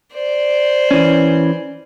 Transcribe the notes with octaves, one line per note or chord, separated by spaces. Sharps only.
C5 D5
E3 C#4